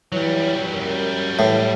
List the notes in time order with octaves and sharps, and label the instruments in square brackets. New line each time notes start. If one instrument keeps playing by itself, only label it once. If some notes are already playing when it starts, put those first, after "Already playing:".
[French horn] E3 [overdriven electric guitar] F#3 G3 [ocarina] C#5
[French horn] F#2 [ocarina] A#4
[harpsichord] A2 [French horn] E3 [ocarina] C#5